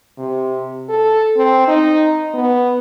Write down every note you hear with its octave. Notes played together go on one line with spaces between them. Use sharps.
C3
A4
C4
D#4
B3